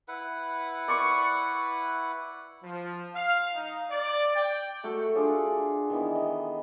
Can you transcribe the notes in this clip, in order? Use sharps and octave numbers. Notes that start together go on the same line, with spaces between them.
E4 B4 F#5
D5 C#6
F3
F5
D#4
D5
G5
A3 F#4 A4
D4 F4 G#4 D5
D#3 E3 B3
D#5